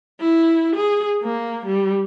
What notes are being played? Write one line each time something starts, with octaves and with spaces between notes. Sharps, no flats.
E4
G#4
A#3
G3